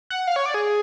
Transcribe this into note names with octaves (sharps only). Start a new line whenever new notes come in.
F#5
F5
C#5
D5
G#4